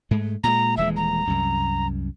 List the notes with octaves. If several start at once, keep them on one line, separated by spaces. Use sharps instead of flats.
G#2 G#3 A3
A#2 G#3 A#5
D#1 E3 G#3 E5
A#5
C2 F#2